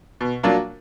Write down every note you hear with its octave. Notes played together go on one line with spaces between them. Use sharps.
B2
F#3 A#3 D4 F4